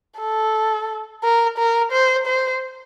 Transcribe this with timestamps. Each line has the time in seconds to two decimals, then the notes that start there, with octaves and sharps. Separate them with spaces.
0.19 A4
1.23 A#4
1.58 A#4
1.92 C5
2.26 C5